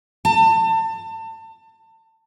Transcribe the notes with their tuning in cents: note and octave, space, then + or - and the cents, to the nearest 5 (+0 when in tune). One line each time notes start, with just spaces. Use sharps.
A5 +30